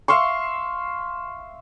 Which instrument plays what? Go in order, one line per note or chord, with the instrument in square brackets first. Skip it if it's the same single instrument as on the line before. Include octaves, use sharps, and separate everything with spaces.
[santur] E5 F5 C6 C#6